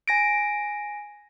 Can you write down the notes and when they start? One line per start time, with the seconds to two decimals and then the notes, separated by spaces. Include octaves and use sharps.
0.08 G#5 A#6 D7